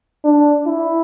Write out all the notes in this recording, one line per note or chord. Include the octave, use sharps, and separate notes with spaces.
D4
E4